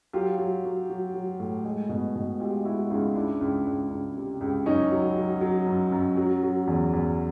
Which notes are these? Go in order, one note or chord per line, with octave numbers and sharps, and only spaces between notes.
F#3 F4 G4
F#3
F#3
F#3
F#3
A2
G#3
B2
B2
G#3 F4 G4
G#3 E4 F#4
C#2 D#4 F4
C#2 D4 E4
C#2
C#2
C#2
C3
C#2
F#2 C#4 D#4
F#3
F#3
F#3
F#2
F#2
F#3
F#3
E2
E2